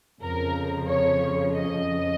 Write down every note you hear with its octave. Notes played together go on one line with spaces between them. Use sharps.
F2 C#3 F3 A#4
C#5
D#5